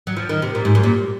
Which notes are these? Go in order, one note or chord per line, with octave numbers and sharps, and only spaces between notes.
F#3
F3
D#3
C3
A#2
G#2
F#2
A#2